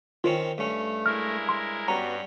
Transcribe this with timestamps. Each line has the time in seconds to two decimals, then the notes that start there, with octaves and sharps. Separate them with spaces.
0.24 D#3 C4 C#4 F4
0.58 G2 A3 C#4
1.06 G#3 E4 A#4 F6
1.49 C6
1.88 G2 G3 B3 C#4 F#4 A#5